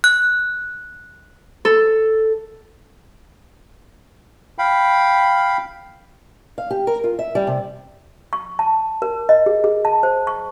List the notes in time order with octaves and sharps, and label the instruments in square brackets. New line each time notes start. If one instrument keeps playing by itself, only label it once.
[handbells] F#6
[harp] A4
[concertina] F5 G5 B5
[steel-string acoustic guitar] F5
G4
A#4
F4
E5
G3
C3
[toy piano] C#6
A5
A#4
D#5
G#4
G#4
A5
C5
C#6